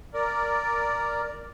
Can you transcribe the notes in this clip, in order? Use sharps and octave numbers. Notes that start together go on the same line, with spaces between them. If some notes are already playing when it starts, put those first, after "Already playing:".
A#4 D5